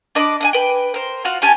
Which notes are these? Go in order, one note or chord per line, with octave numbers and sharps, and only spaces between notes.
D4 D#5 B5 D6
D4 D#5 G#5
B4 G5
A#4 C5
F4 F#4 F5
C#4 G4 G#5 A5